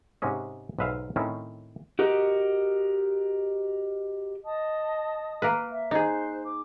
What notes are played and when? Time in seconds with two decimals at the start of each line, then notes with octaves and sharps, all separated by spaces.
0.22 G#2 C3 G#3 C#4 D#5
0.79 B1 G#2 B4 E5 F5
1.16 A2 D#3 C4 C#4
1.99 F#4 G4 A#4 D#5
4.44 D#5 A5 D#6
5.42 A#3 A#4 B4
5.69 E5
5.91 D#4 G#4 C5 F#6
6.43 D6